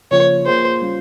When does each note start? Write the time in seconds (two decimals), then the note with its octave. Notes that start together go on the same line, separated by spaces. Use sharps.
0.11 C#3 F3 A#3 F4 C#5
0.46 A#3 F4 G#4 C5
0.82 G3 C#4 F4